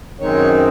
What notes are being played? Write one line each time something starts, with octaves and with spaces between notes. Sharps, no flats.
F#2 D#3 G#3 C4 D#4 C#5